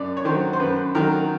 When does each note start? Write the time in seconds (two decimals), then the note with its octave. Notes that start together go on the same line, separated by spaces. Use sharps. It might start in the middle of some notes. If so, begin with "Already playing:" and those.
Already playing: F#2 D5
0.17 C#5
0.25 D#3 F#3 C5
0.53 C5
0.60 F#2 B4
0.95 D#3 F#3 A#4